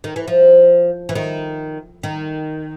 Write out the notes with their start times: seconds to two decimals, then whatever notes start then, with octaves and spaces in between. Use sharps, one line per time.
0.04 D#3
0.16 E3
0.28 F3
1.09 E3
1.15 D#3
2.03 D#3